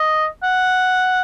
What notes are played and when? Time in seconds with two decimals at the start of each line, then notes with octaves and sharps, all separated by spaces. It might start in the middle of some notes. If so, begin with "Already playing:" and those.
Already playing: D#5
0.43 F#5